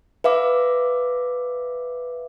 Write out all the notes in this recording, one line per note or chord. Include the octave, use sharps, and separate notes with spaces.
B4 E5 F5 D6